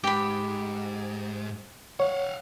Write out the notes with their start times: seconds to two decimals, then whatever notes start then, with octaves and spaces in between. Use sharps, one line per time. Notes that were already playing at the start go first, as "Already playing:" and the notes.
0.04 G#2 G4 B5
2.00 C#5 F5 F#5